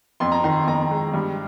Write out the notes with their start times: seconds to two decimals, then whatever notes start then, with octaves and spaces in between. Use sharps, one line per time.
0.20 F2 C6
0.32 A#5
0.44 D#3 C6
0.56 C6
0.68 F2 A#5
0.91 G#3
1.14 G2